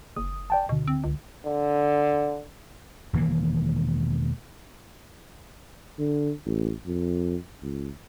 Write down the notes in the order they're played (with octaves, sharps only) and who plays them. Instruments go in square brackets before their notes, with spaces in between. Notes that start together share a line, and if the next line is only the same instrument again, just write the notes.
[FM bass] F#1 [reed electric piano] D#6
[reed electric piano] D5 G5 A5
[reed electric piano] D2 D3 [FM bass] B2
[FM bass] C4
C#2
[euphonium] D3
[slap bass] E1 D#3 E3 A#3
[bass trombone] D3
A1
F2
C#2